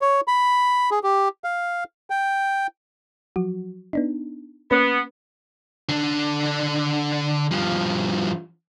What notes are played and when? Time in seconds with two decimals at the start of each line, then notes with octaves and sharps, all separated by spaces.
0.01 C#5
0.28 B5
0.91 G#4
1.03 G4
1.44 F5
2.10 G5
3.36 F3 F#3 F#4
3.93 B3 D4 D#4
4.71 A#3 B3 C#4 B4
5.89 D3 D4
7.51 G2 F3